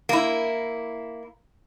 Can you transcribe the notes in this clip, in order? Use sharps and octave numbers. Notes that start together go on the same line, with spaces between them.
A#3 E4